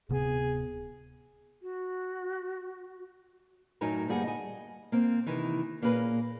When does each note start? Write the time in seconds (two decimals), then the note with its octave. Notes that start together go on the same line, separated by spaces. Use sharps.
0.09 D1 C3 B3 G#4
1.62 F#4
3.81 F#2 A2 F#3 D#4 A#4 G#5
4.08 D2 G2 G3 A#3 G#4 F#5
4.23 D#5 G#5
4.92 A#3 C4
5.26 C3 D#3 E3
5.82 A#2 A#3 C#4 G#4 B4